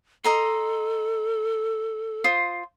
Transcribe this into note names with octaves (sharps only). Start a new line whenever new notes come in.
A4 D#5 A#5 C6
F4 C5 D#6